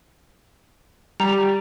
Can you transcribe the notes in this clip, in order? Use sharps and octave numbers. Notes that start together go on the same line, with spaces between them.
G3 A#5 F7